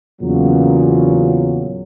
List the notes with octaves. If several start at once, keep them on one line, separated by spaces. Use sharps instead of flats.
E2 A#2 C#3 F#3